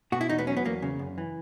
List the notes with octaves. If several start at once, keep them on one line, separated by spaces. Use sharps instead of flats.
B2 F#4
E4
E2 D#4
B3
F#3 C#4
B3
E2 A#3
C#3
F#2
E3